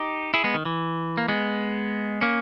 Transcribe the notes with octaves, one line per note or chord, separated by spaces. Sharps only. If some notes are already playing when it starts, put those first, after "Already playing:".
Already playing: D#4 G4
E4 G#4
G#3 B3
D#3
E3
A#3
G#3 B3
A#3 C#4